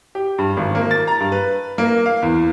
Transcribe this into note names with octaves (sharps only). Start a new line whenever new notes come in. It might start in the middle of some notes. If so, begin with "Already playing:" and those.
G4
G2
G#1
A#3
A6
A#5
G2
B4
A#3
F5
E2